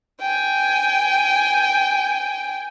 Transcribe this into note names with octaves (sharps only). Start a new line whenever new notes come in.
G5 G#5